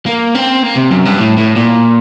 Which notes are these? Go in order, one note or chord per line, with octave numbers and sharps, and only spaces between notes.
A#3
C4
A#3
C3
F#2
G2
A2
A2
A#2